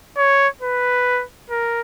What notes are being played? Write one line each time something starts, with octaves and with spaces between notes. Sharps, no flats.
C#5
B4
A#4